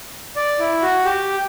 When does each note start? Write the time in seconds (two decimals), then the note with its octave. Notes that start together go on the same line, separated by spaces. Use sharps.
0.36 D5
0.59 E4
0.82 F#4
1.05 G4